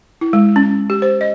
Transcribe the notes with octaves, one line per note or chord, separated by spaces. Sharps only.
E4
G#3
C#4
G4
C5
D#5